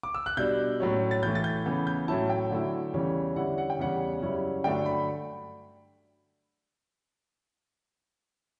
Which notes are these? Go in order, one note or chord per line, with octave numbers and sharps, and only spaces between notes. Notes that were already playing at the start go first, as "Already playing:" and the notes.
D6
E6
F#6
B2 G3 D4 G6
A2 F#3 C#4
A6
A2 E3 A3 G6
A6
G6
C#3 E3 B3
G6
A2 F#3 C#4 E4 A5
G5
D3 F#3 A3 E4
E2 C#3 E3 G3 C#4
D3 G3 C#4 E4 F#5
F#5
G5
E2 C#3 G3 C#4 F#5
F#2 C#3 G3 C#4 E4
G2 D3 F#3 A3 D4 G5
B5